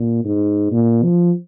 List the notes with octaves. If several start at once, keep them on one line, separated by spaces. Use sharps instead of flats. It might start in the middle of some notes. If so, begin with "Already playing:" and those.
Already playing: A#2
G#2
A#2
F3